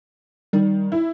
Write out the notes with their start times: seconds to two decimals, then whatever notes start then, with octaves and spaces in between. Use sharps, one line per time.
0.53 D#3 G3
0.92 E4